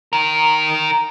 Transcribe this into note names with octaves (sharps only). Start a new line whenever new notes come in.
D#3 A#4